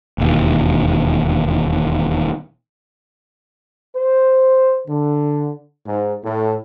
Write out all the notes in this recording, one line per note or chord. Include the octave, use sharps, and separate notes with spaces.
E1 D#2
C5
D3
G#2
A2